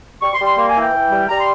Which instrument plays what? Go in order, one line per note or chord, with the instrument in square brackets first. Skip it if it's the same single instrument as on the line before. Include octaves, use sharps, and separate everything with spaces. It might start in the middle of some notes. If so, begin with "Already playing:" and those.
[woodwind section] G3 C#6
C6
G3
C6
A#3 C6
G#5
E3
G5
E3
G3
G3 A#5
C6